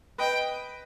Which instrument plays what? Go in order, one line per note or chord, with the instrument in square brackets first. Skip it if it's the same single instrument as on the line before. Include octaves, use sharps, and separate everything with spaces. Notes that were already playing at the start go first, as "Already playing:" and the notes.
[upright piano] B4 D#5 [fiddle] G5